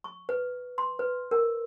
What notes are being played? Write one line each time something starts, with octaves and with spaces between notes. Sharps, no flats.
C#6
B4
C6
B4
A#4